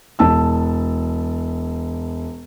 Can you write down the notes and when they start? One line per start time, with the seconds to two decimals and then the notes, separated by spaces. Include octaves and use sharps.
0.19 E1 A5 E6